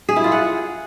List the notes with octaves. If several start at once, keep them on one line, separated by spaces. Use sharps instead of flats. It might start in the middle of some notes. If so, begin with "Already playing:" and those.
G#4
E4
F4
F#5